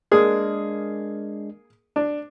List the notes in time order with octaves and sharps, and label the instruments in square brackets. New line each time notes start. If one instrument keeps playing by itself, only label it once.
[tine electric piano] G#3 D4 [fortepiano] A#3 G#4
[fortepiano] D4